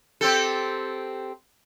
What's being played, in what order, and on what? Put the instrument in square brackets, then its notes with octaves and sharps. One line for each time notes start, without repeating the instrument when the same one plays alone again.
[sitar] C4 G4 A4